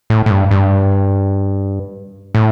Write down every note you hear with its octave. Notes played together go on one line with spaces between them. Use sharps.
A2
A2
G2
G2
A2